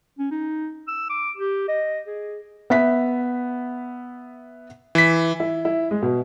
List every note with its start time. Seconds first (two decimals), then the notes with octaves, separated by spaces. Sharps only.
0.19 C#4
0.31 D#4
0.88 E6
1.09 D6
1.37 G4
1.68 D#5
2.07 G#4
2.70 B3 E5 B6
4.95 E3 B6
5.40 E4
5.65 E4
5.91 G#3
6.02 B2